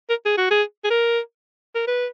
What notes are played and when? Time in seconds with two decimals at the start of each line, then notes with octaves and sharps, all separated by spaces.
0.09 A#4
0.25 G#4
0.38 F#4
0.51 G#4
0.84 G#4
0.90 A#4
1.75 A#4
1.87 B4